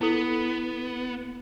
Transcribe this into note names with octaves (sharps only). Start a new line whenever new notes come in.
B3 E4 A4